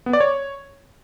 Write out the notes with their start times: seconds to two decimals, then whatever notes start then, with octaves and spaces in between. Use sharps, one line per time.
0.06 B3
0.13 D5
0.20 C#5